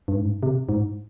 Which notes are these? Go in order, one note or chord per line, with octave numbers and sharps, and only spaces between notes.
G2
G#2
C3
G#2